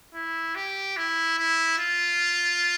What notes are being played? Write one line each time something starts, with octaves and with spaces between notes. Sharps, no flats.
E4
G4
E4
E4
F4